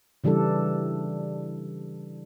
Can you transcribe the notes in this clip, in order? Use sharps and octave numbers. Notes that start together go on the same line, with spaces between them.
C#3 E3 G3 D4 A4